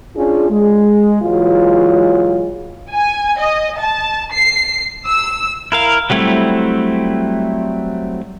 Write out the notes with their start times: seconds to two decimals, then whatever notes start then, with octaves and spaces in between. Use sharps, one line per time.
0.16 C#4 D4 F4 G#4
0.51 G#3
1.22 A#2 E3 F#3 G#3 F4
2.92 G#5
3.39 D#5
3.77 A5
4.33 C7
5.05 E6
5.72 E4 A#4 F5
6.10 F#3 G3 A3 C4 E4